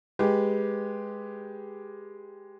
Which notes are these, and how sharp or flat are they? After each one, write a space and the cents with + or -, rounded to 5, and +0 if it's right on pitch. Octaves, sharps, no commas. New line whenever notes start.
G#3 +0 G4 +0 B4 +0